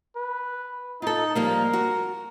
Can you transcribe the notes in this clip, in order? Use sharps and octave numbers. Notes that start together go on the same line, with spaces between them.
B4
D#4 F4 A4
F3 G3 A#3 A#4
F#4